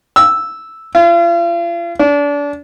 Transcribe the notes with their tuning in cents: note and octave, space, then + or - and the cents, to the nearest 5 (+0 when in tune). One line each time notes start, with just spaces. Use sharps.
E6 -5
F4 -40
D4 -30